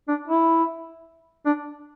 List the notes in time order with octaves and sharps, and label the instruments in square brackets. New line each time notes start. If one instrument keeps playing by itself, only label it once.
[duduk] D4
E4
D4